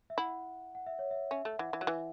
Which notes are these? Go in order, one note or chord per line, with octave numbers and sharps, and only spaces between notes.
E5
E4 F#5
F#5
E5
C#5
E5
C#4 E5
A3
E3 F#5
E3
F#3
E3 E5